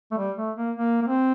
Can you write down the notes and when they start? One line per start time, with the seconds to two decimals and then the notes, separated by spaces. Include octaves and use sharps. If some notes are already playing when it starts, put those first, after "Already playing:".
0.12 A3
0.17 G3
0.37 A3
0.57 A#3
0.77 A#3
1.02 A#3
1.07 C4